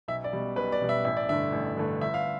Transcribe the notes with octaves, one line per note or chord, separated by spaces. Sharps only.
B1 E5
D5
B2 G3
B1 B4
D5
B2 G3
E5
A1 E5
D5
G2 D3 A3 E5
A1
G2 D3 A3
G1 E5
F5